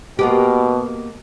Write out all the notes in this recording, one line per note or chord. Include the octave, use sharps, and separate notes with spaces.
B2 A#3 B3 G4